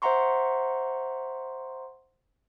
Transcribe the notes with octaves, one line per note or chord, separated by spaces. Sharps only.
C5 E5 F#5 A#5 C6 C#6